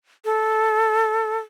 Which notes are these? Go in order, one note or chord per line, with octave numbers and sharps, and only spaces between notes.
A4